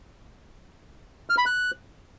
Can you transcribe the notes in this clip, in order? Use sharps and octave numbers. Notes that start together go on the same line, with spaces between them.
F6
B5
F#6